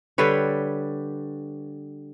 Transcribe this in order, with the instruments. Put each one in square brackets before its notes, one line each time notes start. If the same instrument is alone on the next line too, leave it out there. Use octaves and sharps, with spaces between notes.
[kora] D3 G3 B4 C#5